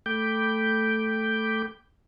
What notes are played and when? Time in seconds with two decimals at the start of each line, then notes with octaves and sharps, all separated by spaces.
0.06 A3 G5 B5 D6 G6